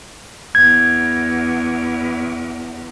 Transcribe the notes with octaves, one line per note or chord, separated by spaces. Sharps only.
E2 G#6